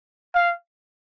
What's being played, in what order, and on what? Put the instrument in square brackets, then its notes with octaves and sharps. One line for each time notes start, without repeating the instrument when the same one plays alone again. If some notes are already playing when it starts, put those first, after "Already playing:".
[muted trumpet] F5